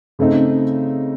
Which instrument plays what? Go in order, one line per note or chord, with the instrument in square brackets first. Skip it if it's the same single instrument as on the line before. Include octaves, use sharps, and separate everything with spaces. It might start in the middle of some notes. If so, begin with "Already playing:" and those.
[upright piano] C#3 A3 C4 D#4